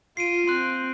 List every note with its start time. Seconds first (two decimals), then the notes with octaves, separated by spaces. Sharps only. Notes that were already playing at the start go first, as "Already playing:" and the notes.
0.17 F4 C7 D7 D#7
0.47 C4 C6 F#6